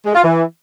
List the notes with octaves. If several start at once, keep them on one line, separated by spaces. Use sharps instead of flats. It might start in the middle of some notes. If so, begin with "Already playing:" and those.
G#3
F4
E3